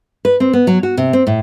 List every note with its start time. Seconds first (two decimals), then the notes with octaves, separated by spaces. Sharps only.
0.25 B4
0.40 C4
0.53 B3
0.67 F#3
0.83 F#4
0.97 C3
1.13 C4
1.27 A2